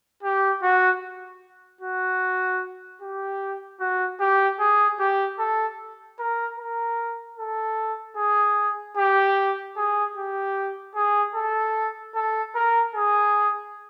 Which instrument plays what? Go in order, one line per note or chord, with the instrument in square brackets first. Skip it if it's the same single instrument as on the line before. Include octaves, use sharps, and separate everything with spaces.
[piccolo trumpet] G4
F#4
F#4
G4
F#4
G4
G#4
G4
A4
A#4
A#4
A4
G#4
G4
G#4
G4
G#4
A4
A4
A#4
G#4